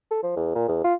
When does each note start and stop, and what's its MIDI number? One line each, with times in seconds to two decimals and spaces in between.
0.11 0.18 69
0.23 0.35 53
0.36 0.54 40
0.55 0.68 46
0.68 0.80 40
0.84 0.94 65